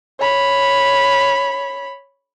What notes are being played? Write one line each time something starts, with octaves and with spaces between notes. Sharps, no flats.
C#5 B5